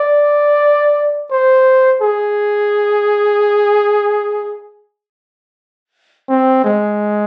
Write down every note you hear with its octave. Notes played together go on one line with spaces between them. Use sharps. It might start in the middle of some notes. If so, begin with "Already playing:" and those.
Already playing: D5
C5
G#4
C4
G#3